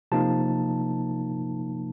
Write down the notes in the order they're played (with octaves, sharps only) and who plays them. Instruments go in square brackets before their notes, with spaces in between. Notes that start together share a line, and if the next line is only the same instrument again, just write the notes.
[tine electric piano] C3 F3 A#3 D#4 A5